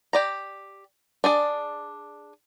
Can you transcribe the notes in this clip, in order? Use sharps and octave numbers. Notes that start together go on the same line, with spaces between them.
G4 D5 A#5
D4 G#4 D5